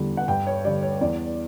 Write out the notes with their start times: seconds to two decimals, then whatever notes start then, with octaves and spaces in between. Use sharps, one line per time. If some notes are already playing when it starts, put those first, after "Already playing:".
Already playing: E2 D3 G3
0.17 F#5
0.28 G2 G5
0.47 C#5
0.65 D3 G3 D5
0.82 C#5
1.01 E2 D5